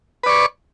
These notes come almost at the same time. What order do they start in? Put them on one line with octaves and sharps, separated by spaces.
B4 D5 C#6